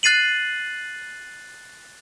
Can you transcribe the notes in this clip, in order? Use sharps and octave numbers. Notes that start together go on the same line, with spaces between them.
F#6 A6 C7 D#7 F#7